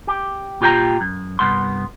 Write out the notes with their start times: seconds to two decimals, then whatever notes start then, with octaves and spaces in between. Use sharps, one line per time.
0.07 G4
0.61 A#2 F4 G4 B4 G5 A#5
1.01 F#2
1.39 C2 G2 B3 C6